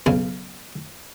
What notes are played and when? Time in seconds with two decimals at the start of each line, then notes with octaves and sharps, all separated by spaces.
0.06 B1 C#3 F5